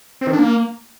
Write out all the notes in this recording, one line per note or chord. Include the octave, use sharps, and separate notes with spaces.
C4
D#3
D4
A#3